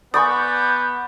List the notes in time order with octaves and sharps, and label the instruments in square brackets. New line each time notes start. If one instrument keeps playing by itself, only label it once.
[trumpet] B3 [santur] D5 B5 C#6 [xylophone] G#5 D#6 [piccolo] G6